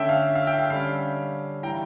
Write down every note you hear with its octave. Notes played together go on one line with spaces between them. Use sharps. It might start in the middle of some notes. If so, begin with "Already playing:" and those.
Already playing: D3 A3 C#4 E5 G5
F5
F5
E5 G5
F5
D3 G3 C#4 F5
A2 E3 G3 G5 A#5